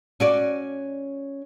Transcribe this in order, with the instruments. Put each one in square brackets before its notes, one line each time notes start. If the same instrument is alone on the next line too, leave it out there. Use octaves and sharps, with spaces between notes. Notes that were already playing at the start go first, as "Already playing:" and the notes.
[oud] C#4 F#4 D5